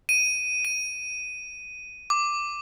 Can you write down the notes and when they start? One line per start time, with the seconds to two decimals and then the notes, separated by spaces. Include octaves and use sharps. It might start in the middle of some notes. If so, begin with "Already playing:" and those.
0.09 D#7
0.65 D#7
2.10 D6